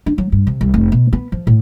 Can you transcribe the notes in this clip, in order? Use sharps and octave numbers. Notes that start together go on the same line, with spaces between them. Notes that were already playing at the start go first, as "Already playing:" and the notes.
D4
F#3
G2
C3
C2
F1
B2
B3
F3
A2